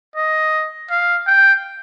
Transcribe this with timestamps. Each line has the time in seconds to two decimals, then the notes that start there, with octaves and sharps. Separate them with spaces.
0.16 D#5
0.90 F5
1.27 G5